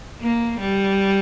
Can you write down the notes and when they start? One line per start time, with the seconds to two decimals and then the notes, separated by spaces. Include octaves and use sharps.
0.21 A#3
0.60 G3